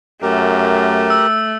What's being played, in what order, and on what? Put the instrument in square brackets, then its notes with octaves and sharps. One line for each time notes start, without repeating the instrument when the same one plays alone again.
[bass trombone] F#2 [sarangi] A3 [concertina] G4 A#4
[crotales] E6